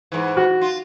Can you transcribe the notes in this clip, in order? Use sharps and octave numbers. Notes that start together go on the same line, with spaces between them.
G#2 E3
F#4
F4